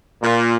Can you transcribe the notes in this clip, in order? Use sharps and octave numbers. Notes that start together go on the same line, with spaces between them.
A#2